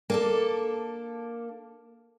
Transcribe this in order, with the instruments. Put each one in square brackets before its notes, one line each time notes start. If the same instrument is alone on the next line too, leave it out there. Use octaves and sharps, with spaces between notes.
[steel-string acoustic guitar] A#3 D4 A4